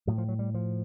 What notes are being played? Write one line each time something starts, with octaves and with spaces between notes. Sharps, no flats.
A2 F#3
F3
F#3
G3
F3